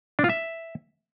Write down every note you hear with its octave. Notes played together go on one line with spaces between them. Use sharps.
D4
F4
E5